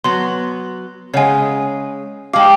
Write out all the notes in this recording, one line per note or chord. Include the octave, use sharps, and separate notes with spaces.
F#3 B3 C6
C#3 G#3 C#5 F#5 G#5
G#3 G4 F5 A5 D6